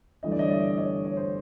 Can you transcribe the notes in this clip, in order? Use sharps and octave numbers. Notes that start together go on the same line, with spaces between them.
G1 G2 E3 A3 D#5
D5
C#5 D#5
D5 E5
C#5 D#5
C#5
C5